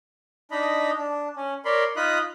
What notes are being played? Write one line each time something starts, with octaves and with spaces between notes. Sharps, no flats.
D4 D#4 D#5 B5
D4
C#4
A#4 C#5 D5 B5 C6
D#4 F4 D#5 B5 D#6 F#6